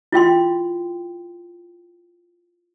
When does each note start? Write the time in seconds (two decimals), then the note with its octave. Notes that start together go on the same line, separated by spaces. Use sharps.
0.12 E4 F4 G5 C6